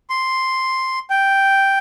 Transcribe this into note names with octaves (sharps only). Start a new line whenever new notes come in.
C6
G5